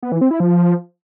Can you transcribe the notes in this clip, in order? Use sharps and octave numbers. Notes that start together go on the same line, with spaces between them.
B3
E3
C4
E4
F3